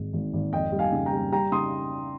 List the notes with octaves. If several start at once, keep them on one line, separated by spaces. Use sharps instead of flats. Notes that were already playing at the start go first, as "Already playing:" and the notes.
Already playing: G#1 G#2
G#1
G#1
F2 D#5 G5
G3
F5 G#5
C#3
G5 A#5
G3
G3 G5 A#5
C#3 C6 D#6